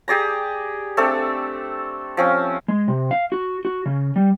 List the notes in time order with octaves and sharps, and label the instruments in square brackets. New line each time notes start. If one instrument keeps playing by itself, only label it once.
[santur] G4 G#4 D5 A#5
A3 C4 D4 A4
F3 C4 C#4
[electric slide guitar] G#3
C3
F5
F#4
F#4
C#3
G3